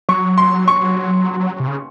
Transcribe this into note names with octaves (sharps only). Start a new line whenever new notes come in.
F#3 C#6
C6
C#6
C3
C#3